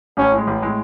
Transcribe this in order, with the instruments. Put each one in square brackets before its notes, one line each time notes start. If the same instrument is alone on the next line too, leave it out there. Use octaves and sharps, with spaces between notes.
[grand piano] A1 [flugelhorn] C#4
[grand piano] A2
G#3
A1
A2 G#3